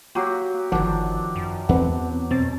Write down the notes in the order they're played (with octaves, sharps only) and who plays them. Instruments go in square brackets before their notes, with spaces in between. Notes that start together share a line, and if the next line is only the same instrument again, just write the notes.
[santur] F#3 F#4 G4 [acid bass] A#3
[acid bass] G1 [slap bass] D#3 F3 [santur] D4 [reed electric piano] F#5
[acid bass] F#2
[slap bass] E2 [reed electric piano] C4 B4 F#5
[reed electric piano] F#2 C4 A6 [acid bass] B2